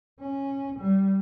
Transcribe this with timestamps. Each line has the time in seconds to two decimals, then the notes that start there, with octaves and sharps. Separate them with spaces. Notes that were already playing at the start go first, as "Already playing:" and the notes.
0.20 C#4
0.80 G3